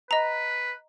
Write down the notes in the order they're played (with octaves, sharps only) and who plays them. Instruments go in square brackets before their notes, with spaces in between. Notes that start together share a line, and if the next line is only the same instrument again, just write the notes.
[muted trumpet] B4 [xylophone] D#5 A#5